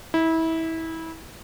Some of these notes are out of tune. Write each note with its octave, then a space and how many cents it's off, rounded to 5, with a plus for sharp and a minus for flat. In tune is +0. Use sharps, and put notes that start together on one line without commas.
E4 -25